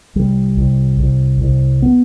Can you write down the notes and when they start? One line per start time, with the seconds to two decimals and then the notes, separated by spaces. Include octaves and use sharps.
0.15 C2 G3
0.57 C2
1.00 C2
1.41 C2
1.82 B3